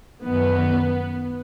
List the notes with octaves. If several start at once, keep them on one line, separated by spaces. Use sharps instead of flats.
F#2 D#3 B3